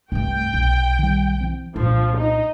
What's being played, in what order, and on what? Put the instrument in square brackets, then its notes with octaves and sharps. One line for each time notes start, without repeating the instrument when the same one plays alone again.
[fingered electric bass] C2 [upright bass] G2 A3 [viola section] G5
[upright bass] B1
[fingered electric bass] D#3 G3
E3 C4
[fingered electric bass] C2 A#2 [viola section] F3 [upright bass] D4
[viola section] D#4